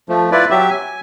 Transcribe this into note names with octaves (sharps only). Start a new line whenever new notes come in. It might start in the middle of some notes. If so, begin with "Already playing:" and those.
F3 A3
E4 F4 B4 D5
F#3 G4 E5
G#5